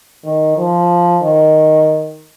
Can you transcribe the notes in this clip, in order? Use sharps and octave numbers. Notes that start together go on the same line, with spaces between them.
D#3
F3
D#3